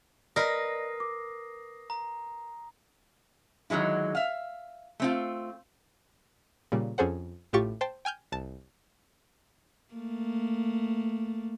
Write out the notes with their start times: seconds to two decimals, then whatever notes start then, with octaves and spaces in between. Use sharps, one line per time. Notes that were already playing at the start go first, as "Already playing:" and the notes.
0.36 A#4 B4 D5 D#5 D#6 F6 A#6 C7
1.00 D6
1.90 A#5
3.70 D3 D#3 F#3 G#3 E4
4.15 E5 F5
5.00 A3 C4 F4
6.72 A#2 C#3 G3
6.98 F2 C#4 G#4 A4 C5 F#5
7.53 A1 A2 F4 G4 C#6 A6
7.81 C5 G5 A5
8.05 G5 G#5 F6 G6
8.32 C2 A5
9.94 A3 A#3